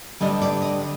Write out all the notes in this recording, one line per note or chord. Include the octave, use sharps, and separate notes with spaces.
D3 G3 D4 D#5
D5
D#5